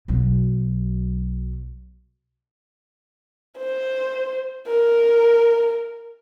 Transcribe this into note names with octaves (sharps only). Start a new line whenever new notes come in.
B1 F#3
C5
A#4